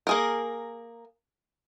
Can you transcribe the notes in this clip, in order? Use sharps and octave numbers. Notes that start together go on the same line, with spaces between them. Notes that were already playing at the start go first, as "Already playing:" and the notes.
A#3 G#4 A#4